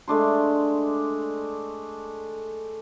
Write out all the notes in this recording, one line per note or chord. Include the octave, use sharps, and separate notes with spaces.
G#3 A3 D4 C6